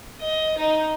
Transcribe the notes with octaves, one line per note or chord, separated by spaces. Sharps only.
D#5
D#4